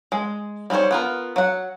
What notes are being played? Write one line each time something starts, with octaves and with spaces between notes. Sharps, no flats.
G#3
G3 D#4 G#4 C5 C#5
B3 F4 A#4
F#3 F#5